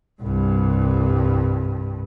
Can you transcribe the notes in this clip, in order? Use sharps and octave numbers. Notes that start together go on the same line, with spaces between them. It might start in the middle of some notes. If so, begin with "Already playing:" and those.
C2 G2